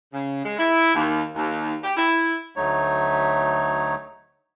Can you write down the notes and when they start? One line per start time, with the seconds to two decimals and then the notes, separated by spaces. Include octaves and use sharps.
0.13 C#3
0.44 G#3
0.58 E4
0.95 D#2
1.35 D#2
1.83 G4
1.96 E4
2.56 D2 F#3 A3 D#4 C#5